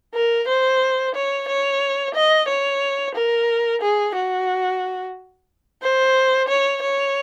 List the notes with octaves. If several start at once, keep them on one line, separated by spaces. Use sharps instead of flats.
A#4
C5
C#5
C#5
D#5
C#5
A#4
G#4
F#4
C5
C#5
C#5